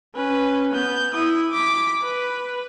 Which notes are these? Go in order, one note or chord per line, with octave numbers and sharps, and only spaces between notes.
C#4 B4
B3 G6
E4 D#6
D6 B6
B4